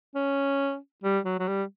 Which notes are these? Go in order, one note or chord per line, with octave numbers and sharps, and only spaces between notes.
C#4
G3
F#3
F#3
G3